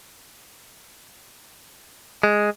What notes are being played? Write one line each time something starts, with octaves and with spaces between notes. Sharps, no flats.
G#3